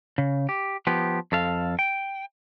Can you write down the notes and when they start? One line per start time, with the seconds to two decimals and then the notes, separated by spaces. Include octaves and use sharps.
0.18 C#3
0.49 G4
0.87 F3 B3 G4
1.32 F2 A4 F5
1.79 G5